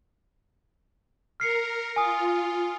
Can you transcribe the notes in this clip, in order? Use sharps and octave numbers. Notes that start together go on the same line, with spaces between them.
A#4 F6 C7 C#7
F4 G#5 D#6